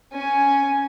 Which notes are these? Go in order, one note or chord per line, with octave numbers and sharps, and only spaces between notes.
C#4 G#5